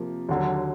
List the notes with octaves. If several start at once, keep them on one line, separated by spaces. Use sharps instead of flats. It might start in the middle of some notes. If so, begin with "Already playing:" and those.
Already playing: C3 F3 A#3
D#2 D3 F#3